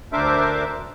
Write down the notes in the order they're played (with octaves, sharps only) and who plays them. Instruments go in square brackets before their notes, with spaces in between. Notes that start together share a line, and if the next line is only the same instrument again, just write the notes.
[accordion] D2 D4 A#4 C5 E5 D6